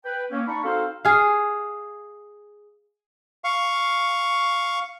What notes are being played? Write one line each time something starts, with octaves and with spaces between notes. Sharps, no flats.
B4 G5
A#3 C4 C#4
D4 D#4 D5 B5 C#6
C4 D#4 F#4 A4 C5 F5
G#4 F5
F5 C#6